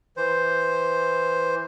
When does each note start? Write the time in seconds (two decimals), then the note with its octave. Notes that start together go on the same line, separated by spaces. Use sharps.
0.17 E3 C5